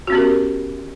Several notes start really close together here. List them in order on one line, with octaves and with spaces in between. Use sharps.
F#4 C#4 B3 G4 A#4